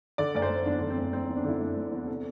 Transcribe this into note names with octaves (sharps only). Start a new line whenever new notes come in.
D3 D5
F#1 D5
C5
F#1
E2 D4
D3 D4
C4
F#1
F#1 C4
E2
D4
D3 E4
F#1 D4
F#1
E2
C3 A4